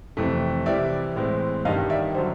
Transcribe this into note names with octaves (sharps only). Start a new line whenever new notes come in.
F2 C3 E3 A3
C3 E3 G3 D5 E5
A2 E3 G#3 C4
G2 D#3 G3 D#5 F5
D5 E5
D3 F#3 C5